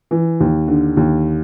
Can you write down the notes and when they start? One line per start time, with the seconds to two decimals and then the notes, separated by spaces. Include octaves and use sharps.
0.11 E3
0.40 D#2
0.68 D3
0.97 D#2